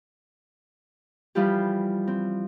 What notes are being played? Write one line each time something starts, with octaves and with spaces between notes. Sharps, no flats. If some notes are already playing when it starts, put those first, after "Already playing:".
E3 F3 G3 F4 G4
C4